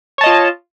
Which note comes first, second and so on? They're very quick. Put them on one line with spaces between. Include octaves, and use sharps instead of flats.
C#5 A5 D#5 F4